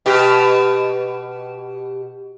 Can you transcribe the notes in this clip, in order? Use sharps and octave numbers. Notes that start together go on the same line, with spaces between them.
B2 G4